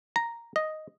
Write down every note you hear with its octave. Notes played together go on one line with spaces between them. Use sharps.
A#5
D#5